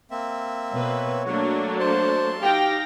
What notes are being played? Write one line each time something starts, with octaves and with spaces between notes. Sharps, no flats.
A#3 C4 E5
B2 B4 C#5
F#3 A3 A#3 D4 F#4
C5 A5 C6
D#4 G4 F5 G5 A#6